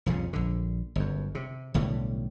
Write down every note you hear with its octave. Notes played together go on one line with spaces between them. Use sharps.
C2 F2 A#2 C#3
A#1 D3
G1 F#2
C3
B1 A2 D3 G3